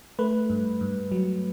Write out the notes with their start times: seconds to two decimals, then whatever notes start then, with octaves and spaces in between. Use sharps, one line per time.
0.19 A3 B4
0.50 G2
0.81 G2
1.12 F#3